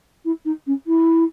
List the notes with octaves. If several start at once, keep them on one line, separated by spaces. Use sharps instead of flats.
E4
D#4
C#4
E4